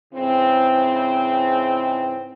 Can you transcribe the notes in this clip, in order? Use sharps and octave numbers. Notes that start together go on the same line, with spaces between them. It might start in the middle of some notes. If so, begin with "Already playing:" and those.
G#2 C#3 E3 C4